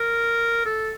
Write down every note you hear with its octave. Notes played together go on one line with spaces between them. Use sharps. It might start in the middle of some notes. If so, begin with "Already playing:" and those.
Already playing: A#4
A4